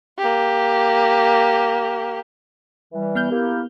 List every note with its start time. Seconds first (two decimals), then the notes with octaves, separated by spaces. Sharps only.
0.19 A#3 G4
2.93 E3 G3
3.15 B3 F6 G6
3.31 A#3 E4 G4